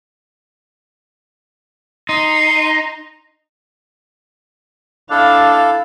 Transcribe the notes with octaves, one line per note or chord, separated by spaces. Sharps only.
D#4 C6
D4 E4 A4 F5